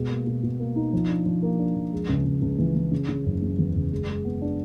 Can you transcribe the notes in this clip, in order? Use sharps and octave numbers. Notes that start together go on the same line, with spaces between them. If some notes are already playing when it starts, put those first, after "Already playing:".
Already playing: B2 G#3
A#3
B2
B2
A#3
D#4
F3
D4
F3
A#3
D4
F3
G#3
C#2
C#2
C#2
E3
E3
C#3
C#3
F#1
C#3
E2
F#1
G#3
G#3
B3
D4